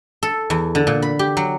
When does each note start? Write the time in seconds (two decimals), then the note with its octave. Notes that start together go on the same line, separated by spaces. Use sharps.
0.23 A4
0.50 E2
0.75 D3
0.87 A#2
1.02 B5
1.19 G4
1.37 F#3